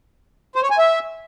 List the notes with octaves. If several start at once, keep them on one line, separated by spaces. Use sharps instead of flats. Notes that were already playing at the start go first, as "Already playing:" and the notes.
C5
C#5
G#5
E5